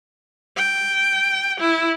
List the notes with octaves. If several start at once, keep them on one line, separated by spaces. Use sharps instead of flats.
G5
E4